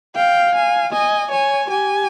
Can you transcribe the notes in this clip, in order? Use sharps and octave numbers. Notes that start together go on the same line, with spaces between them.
F5 G5
G#5
D#5 G#5
C#5 G#5
G4 G#5